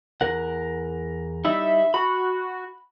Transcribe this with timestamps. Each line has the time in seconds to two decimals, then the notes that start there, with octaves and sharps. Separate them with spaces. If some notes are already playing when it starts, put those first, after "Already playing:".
0.21 E2 A#4 F#5
1.45 G3 D#4 E4 E5
1.94 F#4 B5